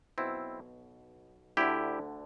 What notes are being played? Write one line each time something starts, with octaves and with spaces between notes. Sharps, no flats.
B1 B2 C4 E4
D2 D3 E4 G4